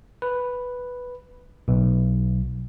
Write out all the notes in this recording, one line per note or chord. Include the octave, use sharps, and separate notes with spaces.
B4
B1